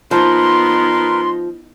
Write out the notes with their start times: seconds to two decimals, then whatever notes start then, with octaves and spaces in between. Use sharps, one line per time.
0.11 F3 B3 D#4 A#4 B4 C6